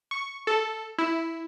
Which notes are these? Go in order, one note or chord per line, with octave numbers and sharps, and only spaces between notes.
C#6
A4
E4